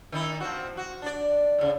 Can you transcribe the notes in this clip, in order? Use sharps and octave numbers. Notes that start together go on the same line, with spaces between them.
D#3 D#4 E4
F3 C4 F#4
F#4
D4 D5
A2 C#3